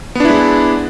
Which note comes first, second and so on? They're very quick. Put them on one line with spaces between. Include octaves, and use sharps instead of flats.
B3 D4 E4 G#3